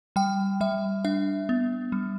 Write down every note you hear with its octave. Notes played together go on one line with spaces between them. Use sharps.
G3 G5
G3 E5
D4 E5
B3
G3